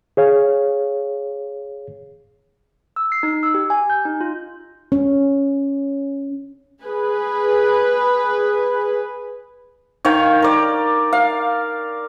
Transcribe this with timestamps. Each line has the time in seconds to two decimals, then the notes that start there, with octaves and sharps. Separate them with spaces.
0.17 G#4 C#5 F5
2.96 E6
3.12 C7
3.23 D#4
3.43 E6
3.54 G4
3.70 G#5
3.90 G6
4.05 D#4
4.21 F4
4.92 C#4
6.84 G#4 B4
10.05 D#3 C#5 F5 G5
10.42 A#4 D5
11.13 F5